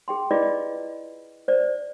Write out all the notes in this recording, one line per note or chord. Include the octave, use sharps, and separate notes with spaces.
G#4 G5 C6
E4 F4 G#4 B4 D5 D#5
C5 D5